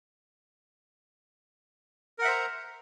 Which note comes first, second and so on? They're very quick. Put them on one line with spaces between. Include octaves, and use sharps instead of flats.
A#4 F#5 E5 C5 A#5